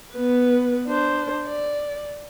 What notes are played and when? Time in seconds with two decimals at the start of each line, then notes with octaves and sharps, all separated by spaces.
0.14 B3 B4
0.87 D4 C5
1.46 D5